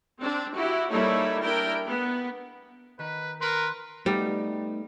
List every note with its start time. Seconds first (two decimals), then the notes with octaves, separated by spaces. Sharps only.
0.19 C4 D4
0.55 E4 F#4 G4
0.90 G3 A#3 D#4 E4 A4 C#5
1.42 D4 E4 A#4 G5
1.87 B3
2.99 D#3 B4
3.41 A#4 B4 C6 F#6
4.06 G3 A3 B3 D#4